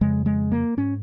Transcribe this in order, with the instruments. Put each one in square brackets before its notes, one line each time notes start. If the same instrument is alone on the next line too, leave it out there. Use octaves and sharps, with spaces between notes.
[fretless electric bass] F2 C#3 G#3
G#3
A#3
G#2 C#4